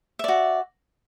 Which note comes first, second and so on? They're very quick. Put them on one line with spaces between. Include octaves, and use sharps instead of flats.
E5 D5 F#4